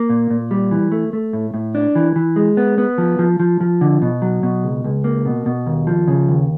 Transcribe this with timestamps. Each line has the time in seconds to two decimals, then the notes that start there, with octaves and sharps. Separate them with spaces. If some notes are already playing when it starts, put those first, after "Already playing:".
Already playing: A#3
0.10 A#2
0.31 A#2
0.51 G3
0.71 E3
0.92 A3
1.13 A3
1.33 A2
1.54 A2
1.75 D4
1.95 E3
2.16 E3
2.36 G#3
2.57 B3
2.78 B3
2.98 F3
3.19 F3
3.40 F3
3.61 F3
3.81 D3
4.02 B2
4.22 F#3
4.43 B2
4.64 C#2
4.84 C#2
5.04 A#3
5.26 B2
5.46 B2
5.67 D#2
5.87 F3
6.08 C#3
6.28 D#2